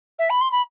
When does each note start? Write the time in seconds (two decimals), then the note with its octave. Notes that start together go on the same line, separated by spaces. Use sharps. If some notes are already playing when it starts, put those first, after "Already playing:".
0.19 E5
0.30 B5
0.41 C6
0.52 B5